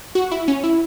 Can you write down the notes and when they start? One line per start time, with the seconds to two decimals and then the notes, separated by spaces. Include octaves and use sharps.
0.15 F#4
0.32 E4
0.48 C#4
0.64 E4